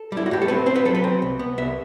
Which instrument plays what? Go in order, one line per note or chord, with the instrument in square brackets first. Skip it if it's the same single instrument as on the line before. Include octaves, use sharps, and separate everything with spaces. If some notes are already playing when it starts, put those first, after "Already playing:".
Already playing: [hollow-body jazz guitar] A4
G3 E4
F#4
A2 G4
A4
C4 B4
C4 C5
B4
F#3 A4
B4
C4
C2
B3
C2 E5